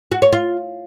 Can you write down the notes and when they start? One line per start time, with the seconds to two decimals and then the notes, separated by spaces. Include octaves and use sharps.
0.12 F#4
0.22 C#5
0.33 F4